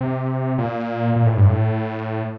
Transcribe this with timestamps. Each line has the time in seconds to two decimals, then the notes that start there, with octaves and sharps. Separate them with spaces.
0.01 C3
0.58 A#2
1.16 A#2
1.26 A2
1.37 G2
1.47 A2